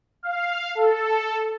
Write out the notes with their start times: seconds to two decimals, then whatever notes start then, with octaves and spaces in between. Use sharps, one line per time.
0.23 F5
0.75 A4